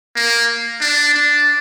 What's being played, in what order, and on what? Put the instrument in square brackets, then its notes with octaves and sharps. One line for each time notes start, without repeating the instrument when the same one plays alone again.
[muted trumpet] A#3
D4
D4